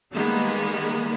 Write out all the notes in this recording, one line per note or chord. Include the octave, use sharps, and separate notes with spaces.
D#3 G3 G#3 A#3 B3